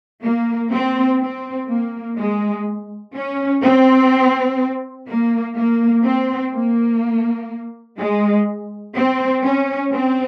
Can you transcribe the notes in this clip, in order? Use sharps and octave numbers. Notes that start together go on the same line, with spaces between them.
A#3
C4
C4
A#3
G#3
C#4
C4
A#3
A#3
C4
A#3
G#3
C4
C#4
C4